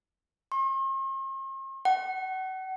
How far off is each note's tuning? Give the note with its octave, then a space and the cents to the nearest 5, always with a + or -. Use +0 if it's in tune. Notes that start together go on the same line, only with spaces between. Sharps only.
C6 +45
F#5 +35